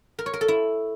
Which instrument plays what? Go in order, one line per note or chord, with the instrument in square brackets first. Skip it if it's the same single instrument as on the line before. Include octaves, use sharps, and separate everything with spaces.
[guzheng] A#4
C#5
A#4
A4
E4